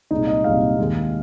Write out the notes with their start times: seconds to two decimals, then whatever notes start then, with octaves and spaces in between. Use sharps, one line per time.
0.11 C2 A#2 G#3 D#4
0.27 D#5
0.44 C2 A#2 G#3 F5
0.78 D#2 D#3 G#3